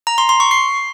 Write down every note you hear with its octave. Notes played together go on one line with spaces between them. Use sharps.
A#5
C6
C6
C#6
C7